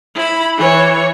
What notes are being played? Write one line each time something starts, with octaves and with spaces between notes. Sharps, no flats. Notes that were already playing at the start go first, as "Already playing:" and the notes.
E4 B5
E3 C#5